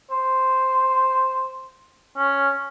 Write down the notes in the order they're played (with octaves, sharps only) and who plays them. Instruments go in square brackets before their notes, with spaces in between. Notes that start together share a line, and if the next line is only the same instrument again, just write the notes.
[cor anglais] C5
C#4